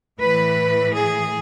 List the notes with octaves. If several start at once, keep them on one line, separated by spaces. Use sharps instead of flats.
A2 E3 B4
G#4